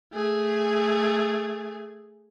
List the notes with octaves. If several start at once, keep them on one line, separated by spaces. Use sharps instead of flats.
A3 G#4